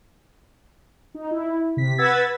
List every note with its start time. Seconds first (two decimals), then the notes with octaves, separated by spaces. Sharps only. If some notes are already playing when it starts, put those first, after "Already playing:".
1.15 D#4
1.31 E4
1.77 C3 B6
1.98 B4 F#5 E6 G#6 A6 B6